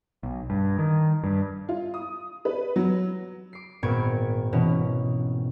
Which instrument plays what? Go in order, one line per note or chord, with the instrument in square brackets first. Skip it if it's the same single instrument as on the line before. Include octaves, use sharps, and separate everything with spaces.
[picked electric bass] B1
G2
D#3
G2
[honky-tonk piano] F4
D#6
B4
F#3
[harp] D6 C7
G#1 A#2 B3 C#6 G#6 D7
B2 E3 C#4